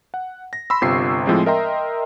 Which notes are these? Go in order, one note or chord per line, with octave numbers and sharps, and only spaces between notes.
F#5
A#6
B5 C6 E6
G1 C3 F4 C#6 C7
A2 F3 G#3 C4
A#4 D#5 E5 G5 A#5 C6